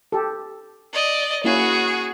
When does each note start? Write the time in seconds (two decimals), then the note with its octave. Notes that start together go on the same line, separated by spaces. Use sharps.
0.12 G4 A4
0.93 D5 D#5
1.44 A#3 C#4 E4 F#4 G#4